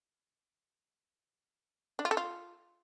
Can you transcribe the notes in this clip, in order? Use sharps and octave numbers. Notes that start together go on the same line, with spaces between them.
D4
F4
A4
F4